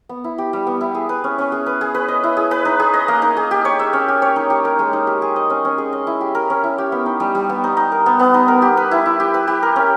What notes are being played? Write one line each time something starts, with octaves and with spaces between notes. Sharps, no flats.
B3
E4
G4
G3
B3
E4
G#4
B4
C#4
C#4
G#4
B4
G#4
B4
D#5
E4
G#4
B4
D#4
G#4
D#5
A#3
D#4
G#4
G4
C#5
E5
C#4
G4
C#5
D#4
G4
A#4
G#3
D#4
G4
G#4
D#5
C#4
C#4
G#4
D#5
E4
G4
A#4
C#4
E4
G4
B3
D#4
G3
G3
B3
D#4
D#4
A#4
B3
B3
D#4
A#4
G4
B4
E4
E4
G4
B4
G4
A#4
C#4